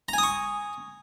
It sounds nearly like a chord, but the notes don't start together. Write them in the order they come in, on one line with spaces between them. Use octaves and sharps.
A#5 G#5 D#6 C#6